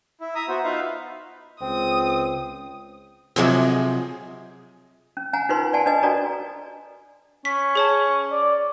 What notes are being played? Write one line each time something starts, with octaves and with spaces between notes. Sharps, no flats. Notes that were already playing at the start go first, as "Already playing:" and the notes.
E4
E5 A#5 D#6
B3 F#4 C5
D#4 F4 B4 E5 F5
C#2 C4 D#6
C3 F3 F#3 C4 G#4 D#5
C#4
C#4 F#5 G#5 A#5
D#4 F4 A#4 B4 B5 C6
D5 F#5 G#5 A5
D4 A4 B4 D#5 G#5
D4 F#4 A4 A#4 D5 A#5
C#4 B6
G#4 C#5 A5
D5